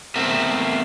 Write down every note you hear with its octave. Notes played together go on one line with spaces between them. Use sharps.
A3 B3 C4 A#4 E5